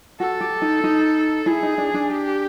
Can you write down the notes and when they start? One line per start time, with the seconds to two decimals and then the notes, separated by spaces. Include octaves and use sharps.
0.20 F#4 A4
0.41 G4
0.62 D#4
0.84 D#4
1.46 E4 G#4
1.63 D#4
1.78 D4
1.94 D4
2.10 G4